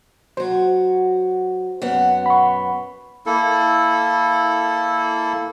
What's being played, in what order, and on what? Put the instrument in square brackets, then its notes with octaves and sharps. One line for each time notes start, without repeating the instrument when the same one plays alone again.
[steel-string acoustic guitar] F#3 F#4 [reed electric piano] C5
[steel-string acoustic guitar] F#2 B3 F#5
[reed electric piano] B5 C#6
[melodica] A#3 E4 A4